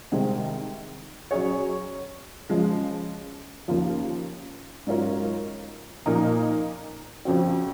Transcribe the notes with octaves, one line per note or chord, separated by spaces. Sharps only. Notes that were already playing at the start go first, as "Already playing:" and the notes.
C2 C3 D#3 G#3 C4
F#3 C#4 G#4 C#5
C#3 F3 G#3
D#2 C#3 F3 A#3 F4
G#2 F#3 C#4 F4 A#4
A#2 F3 A#3 D#4
F2 C#3 F3 C4 F#4